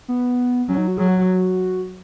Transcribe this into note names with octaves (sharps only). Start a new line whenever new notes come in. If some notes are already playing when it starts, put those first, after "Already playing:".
B3
F#3 C#4
D#4
F#4
F#3 G#4
F#4
F#4